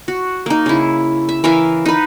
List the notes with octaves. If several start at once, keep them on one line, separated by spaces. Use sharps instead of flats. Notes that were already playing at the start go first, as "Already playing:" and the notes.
F#4
A#3 D#4
C#3 E4
E5
E3 A#4 E5 F5
D#4 B4